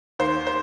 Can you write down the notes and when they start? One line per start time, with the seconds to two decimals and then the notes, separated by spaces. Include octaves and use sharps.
0.19 D#2 C5
0.47 C5